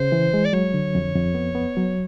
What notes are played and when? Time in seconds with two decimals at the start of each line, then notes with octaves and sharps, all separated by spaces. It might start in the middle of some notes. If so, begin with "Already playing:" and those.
Already playing: C#3 C5
0.12 E3
0.34 G#3
0.45 D5
0.53 F#3 C#5
0.74 D3
0.95 F2
1.15 F2
1.35 B3
1.55 B3
1.77 F#3